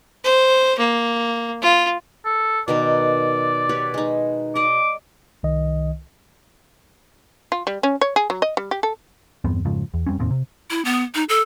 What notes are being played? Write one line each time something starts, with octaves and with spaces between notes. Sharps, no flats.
C5
A#3
F4
A4
B2 D#3 A#4 D5
G4 B4 C#5
G#3 D#4
D5 D#5 D6
C2 D#3 D#5
F4
G3
C#4
C#5
G#4
F#3
D#5
G3
G4
A4
E2 G2 B3 C4
F2 G#2 C#3 F3
E2
F2 G3 C4 C#4
F1 D#2 A2 C4
C3
E4
B3
D#4
A4